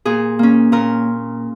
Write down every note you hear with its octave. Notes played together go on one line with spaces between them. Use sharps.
A#2 G#4
A#3 C#4
A#2 A#4